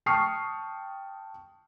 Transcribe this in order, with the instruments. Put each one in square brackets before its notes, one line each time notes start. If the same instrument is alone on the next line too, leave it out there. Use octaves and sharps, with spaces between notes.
[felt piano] G5 A5 C#6 D#6 F6 C7